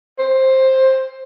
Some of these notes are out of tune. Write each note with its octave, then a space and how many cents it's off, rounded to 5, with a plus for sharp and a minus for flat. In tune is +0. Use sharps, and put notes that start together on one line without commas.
C5 +10